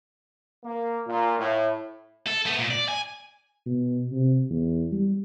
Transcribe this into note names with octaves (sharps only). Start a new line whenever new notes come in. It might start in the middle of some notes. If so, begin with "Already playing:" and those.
A#3
A#2
A2
A4
A3 B3
A#2
D5
G#5
B2
C3
E2
G3